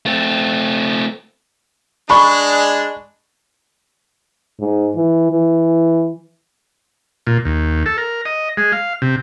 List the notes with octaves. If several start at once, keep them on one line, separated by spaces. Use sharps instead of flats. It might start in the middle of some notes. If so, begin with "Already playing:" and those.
A3 C4
G#3 D4 B5 C#6
G#2
E3
E3
A#2
D#2
A4
A#4
D#5
G#3
F5
C3